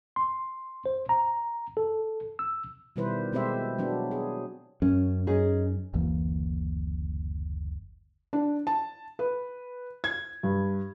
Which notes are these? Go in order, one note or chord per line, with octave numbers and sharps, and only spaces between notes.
C6
C5
A#5
A4
E6
B2 D#3 G3 E4 B4 C5
B2 G#3 C4 G4 C5 E5
F#3 B3 D4
G#4
F#2 C#4
C#4 D#4 G#4
F#1 D2 E3 A#3
D4
A5
B4
G#6
G2